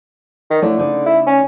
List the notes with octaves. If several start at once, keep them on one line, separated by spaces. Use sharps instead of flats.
D#3
D3 A3 E4 C#5
C#3 D#4 D5
E4
C#4